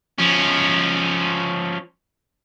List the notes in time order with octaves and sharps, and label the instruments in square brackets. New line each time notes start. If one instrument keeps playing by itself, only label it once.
[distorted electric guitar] F3 C#4